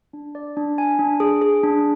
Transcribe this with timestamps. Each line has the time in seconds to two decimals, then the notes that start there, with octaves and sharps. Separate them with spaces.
0.13 D4
0.35 D5
0.57 D4
0.78 G#5
0.99 D4
1.20 G#4
1.42 G#4
1.64 D4